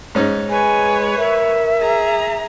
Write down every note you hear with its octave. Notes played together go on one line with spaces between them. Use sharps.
G#2 C#4 D#4
G#3 B4 C#5 G#5
A#4 E5
G#4 A#5